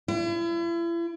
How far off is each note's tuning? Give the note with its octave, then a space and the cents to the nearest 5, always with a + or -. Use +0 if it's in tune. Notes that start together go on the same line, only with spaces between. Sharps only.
E4 +40